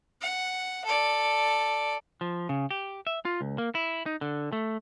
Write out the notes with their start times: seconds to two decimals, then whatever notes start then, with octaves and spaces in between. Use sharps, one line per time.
0.21 F#5
0.84 A4 D5
2.21 F3
2.49 C#3
2.71 G4
3.07 E5
3.25 F4
3.41 C#2
3.58 A#3
3.75 E4
4.06 D#4
4.21 D3
4.53 A3